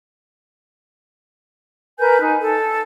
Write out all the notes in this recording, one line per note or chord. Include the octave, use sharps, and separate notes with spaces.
A#4 B4 G#5 G6
D#4 G#5
A4